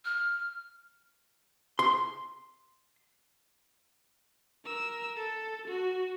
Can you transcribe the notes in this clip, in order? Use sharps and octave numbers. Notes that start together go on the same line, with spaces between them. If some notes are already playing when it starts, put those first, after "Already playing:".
F6
C6
A#4 E6
A4
F#4